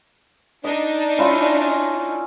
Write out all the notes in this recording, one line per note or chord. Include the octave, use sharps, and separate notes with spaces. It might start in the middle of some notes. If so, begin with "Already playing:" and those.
D4 D#4 D#5
C#4 E4 F4